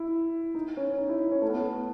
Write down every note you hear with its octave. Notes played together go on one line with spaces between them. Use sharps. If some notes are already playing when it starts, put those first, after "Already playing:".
Already playing: E4
D#4
C#4
D#4
E4
D#4
C#4
A3
B3
A3